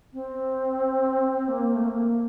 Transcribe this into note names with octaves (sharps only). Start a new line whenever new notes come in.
C4
A#3
A3
A#3